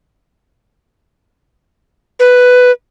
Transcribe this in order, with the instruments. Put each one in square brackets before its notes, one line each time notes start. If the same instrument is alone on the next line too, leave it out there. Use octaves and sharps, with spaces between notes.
[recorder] B4